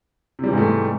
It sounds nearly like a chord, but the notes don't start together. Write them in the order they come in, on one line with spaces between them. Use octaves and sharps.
C3 G3 E3 G#2 A3